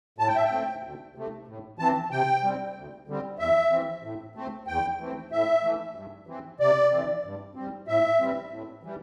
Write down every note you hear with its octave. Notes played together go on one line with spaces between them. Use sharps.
A2 A5
G5
E5
G5
A3 C4
D2
C3 A3
A2
E3 C4 A5
C3 G5
G3 C4
D2
D3 G3 C4
E2 E5
E3 C4
A2
A3 C4
E2 G5
E3 A3 C4
A2 E5
E3 A3
G2
E3 C4
C3 D5
E3 A3 C4
G2
G3 C4
A2 E5
E3 G3 C4
A2
E3 G3